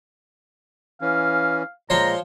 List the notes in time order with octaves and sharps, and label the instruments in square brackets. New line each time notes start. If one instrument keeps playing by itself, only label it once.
[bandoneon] E3 C#4 [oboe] F5
[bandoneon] A#2 G#3 [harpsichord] F3 C5 C#5 [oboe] A#5